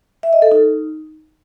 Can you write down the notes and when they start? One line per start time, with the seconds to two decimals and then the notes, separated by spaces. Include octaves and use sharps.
0.23 E5
0.33 D#5
0.42 A4
0.52 D#4